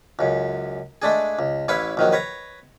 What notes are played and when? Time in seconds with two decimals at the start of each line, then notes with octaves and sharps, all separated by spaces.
0.19 C#2 F#2
1.02 G#3 A3 D4 G#4
1.39 C#2
1.68 A1 E4 B4 C#5 F5 B5
1.97 A#1 D#3 F#3
2.12 B4 C#5 A#5